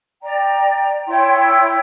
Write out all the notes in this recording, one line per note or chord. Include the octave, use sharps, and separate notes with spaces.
D5 G5 A#5
E4 C#5 G5 C6